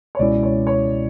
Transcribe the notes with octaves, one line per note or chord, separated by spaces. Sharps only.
C#5
C#2 B2 G#3 C#4 E4 D5
C#5
C#5